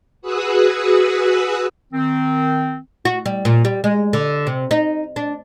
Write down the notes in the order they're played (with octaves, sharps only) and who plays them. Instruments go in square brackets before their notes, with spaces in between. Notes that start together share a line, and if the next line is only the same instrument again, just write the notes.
[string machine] F#4 G#4 B4 D#6 E6 F#6
[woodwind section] D#3 C4
[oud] F#4
G3
A#2
G3
G#3
D3
C3
D#4
D4